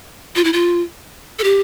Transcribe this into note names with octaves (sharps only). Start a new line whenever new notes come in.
F4
E4
F4
A4
G4